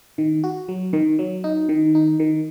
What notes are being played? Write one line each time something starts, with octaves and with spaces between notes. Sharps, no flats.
D#3
F#4
F#3
D#3
F#3
D#4
D#3
D#4
D#3